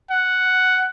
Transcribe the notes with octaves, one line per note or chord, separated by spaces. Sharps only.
F#5